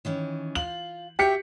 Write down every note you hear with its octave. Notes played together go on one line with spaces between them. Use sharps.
D#3 E3 C#4
F4 F#7
F#4 G4 E5 G5 B6 C#7